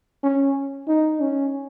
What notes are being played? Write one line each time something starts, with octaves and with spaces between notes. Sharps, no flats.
C#4
D#4
C#4